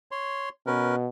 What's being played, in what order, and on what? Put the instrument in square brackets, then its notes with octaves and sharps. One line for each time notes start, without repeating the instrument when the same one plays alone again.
[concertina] C#5 C6
[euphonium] B2 [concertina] C#4 A#4 B4